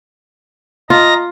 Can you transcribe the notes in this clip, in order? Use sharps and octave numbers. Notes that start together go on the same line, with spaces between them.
F4 D#5 A#5 A#6